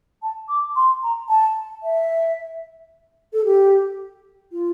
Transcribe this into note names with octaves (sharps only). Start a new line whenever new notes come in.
A5
D6
C6
A#5
A5
E5
A4
G4
F4